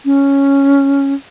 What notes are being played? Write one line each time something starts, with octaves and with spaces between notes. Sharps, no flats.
C#4